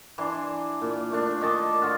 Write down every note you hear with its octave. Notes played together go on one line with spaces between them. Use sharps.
E3 D4 G#5 C6
A#2
A3 D4
D#3 D#5 A5 D6
D3 F4 F#4